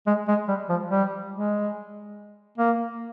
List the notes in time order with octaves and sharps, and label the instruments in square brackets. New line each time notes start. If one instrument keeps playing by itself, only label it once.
[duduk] G#3
G#3
G3
F3
G3
G#3
A#3